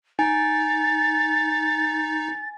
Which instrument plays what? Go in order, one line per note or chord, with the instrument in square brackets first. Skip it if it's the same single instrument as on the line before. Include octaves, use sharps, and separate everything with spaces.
[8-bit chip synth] D#4 [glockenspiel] G#5 [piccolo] A6